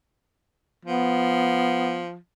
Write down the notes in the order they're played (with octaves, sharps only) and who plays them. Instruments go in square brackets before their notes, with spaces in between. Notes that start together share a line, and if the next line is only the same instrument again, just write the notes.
[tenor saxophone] F3 [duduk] B3